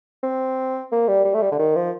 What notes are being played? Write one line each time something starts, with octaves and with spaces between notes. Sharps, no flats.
C4
A#3
G3
G3
A3
G3
D3
D#3
F3